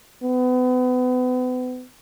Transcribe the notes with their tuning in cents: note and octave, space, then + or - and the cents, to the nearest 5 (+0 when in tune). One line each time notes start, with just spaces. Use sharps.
B3 +35